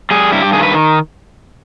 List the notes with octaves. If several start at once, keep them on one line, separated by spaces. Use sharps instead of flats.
G3 G#4
G2 E4
G4
D#3 G#4
B4